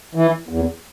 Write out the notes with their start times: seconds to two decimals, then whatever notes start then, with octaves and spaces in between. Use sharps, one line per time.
0.15 E3
0.49 E2